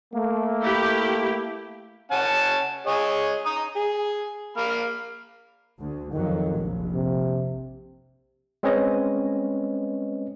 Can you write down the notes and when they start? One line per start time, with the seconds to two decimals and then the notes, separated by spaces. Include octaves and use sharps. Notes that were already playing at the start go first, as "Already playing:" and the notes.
0.12 A3 A#3
0.61 E4 G4
2.11 C#4 F#5 A5
2.87 G#4 C#5 D#5
3.46 A#5 D#6
3.76 G#4
4.57 A#3 B5 F6
5.81 D2
6.13 F2 D#3 F#3
6.53 F1 A#1
6.95 C3
8.63 G#3 C4 C#4 B4 C#5 D#5